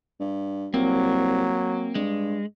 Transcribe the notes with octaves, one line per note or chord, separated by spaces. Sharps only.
G2
C2 F#3 A#3 C4
G2 G#3